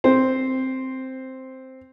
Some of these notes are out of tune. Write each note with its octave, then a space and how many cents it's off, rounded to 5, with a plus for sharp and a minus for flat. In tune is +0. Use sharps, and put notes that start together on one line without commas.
C4 +0 C5 +0